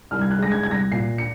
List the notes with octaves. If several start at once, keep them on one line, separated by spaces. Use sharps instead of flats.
C2 F6
G#6
F#6
G#3 A#6
G#6
C2 G#6
A#6
A#2 C7
C#7